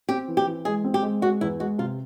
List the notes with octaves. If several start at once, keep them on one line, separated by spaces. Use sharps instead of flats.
C4 G4
E3
G4
E3
G#3 G#4
C4
G4
G#3
G#3 F#4
E2 E4
G#3 F#4
C3 F4